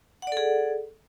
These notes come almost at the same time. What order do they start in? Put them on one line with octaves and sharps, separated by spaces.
F#5 D5 A4 G#4